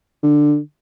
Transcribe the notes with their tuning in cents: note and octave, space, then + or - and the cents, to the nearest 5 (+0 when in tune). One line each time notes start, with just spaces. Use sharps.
D3 +10